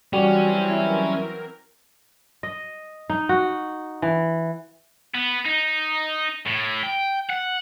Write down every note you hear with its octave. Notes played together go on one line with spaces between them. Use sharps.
E3 F#3 G3 C4 C#4 F#4
E4 A#4
D#5
D#4
F#4
E3
B3
D#4
A2
G5
F#5